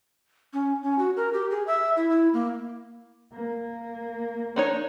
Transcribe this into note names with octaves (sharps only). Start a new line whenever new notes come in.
C#4
C#4
F#4
A#4
G4
G#4
E5
E4
E4
A#3
A#3
D4 D#4 C#5